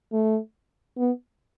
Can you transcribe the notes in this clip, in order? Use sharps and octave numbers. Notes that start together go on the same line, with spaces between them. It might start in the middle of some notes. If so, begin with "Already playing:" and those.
A3
B3